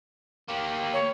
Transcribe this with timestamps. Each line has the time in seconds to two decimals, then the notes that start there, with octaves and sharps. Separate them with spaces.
0.48 A#3 G4
0.94 C#5